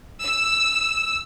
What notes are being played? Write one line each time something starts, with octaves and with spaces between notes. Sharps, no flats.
E6